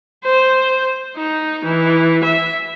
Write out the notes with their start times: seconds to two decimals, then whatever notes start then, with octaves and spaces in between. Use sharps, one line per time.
0.24 C5
1.17 D#4
1.64 E3
2.24 E5